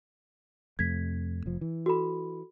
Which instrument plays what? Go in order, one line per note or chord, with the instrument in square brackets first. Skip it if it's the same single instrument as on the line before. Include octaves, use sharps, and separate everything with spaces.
[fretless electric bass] F2 C3 A3 [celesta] G#6 B6
[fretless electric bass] F1 F3
E3
[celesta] F#4 A4 B5